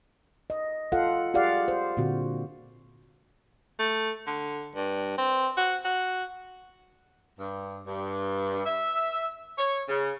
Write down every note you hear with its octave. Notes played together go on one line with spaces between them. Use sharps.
D#5
F4 A4 F5 F#5
F4 G4 G#4 D5 F5 F#5
C5
A#2 D3 C4 F#4
A3
D3
G2
C4
F#4
F#4
G2
G2
E5
C#5
C#3